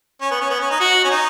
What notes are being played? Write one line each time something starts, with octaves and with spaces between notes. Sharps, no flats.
C#4
B3
C#4
B3
C#4
D#4
F#4
C#4
D#4